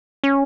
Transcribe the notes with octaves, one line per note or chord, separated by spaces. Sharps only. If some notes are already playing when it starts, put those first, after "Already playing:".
C#4